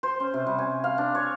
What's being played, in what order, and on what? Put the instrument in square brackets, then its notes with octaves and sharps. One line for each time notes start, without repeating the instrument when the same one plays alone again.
[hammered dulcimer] C5
C#4
C3
G3
G#5
F5
D4
C#5